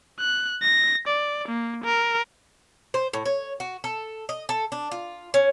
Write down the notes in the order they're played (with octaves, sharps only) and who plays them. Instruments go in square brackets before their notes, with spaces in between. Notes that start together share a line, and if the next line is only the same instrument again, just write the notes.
[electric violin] F#6
A#6
D5
A#3
A#4
[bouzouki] C5
A2
C#5
F#4
A4
D#5
A4
D4
F4
C#4